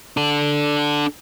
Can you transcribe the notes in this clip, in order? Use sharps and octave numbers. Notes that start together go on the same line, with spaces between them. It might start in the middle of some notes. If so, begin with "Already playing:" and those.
D4 A4